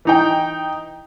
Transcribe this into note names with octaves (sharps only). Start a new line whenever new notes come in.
E3 D#4 G5